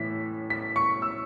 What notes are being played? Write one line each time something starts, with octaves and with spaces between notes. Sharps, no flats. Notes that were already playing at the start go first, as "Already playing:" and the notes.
Already playing: A2 E3 B6
B6
C#6
E6